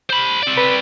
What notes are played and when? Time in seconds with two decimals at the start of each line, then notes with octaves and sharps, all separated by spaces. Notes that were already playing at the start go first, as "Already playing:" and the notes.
0.10 C5 B5
0.43 C4 D5
0.57 B4